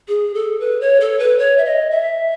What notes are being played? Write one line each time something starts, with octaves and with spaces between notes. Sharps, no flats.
G#4
A4
B4
C#5
A4
B4
C#5
E5
D#5
E5